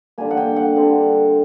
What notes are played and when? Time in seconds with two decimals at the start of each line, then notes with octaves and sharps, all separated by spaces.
0.18 D3 G3 A#3 G#5
0.31 F#5
0.37 G5
0.56 F#5
0.76 D3 G3 C4